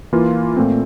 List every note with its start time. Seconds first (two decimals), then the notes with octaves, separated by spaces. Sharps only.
0.13 E3 A#3 F4
0.56 A#2 A3 C4